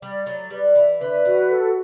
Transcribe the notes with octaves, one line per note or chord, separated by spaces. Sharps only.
G3 D5
F#3 A3 D5
G3 B4
E3 E5
D3 B4
E3 F#4
A4